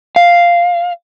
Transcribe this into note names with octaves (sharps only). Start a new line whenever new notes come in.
F5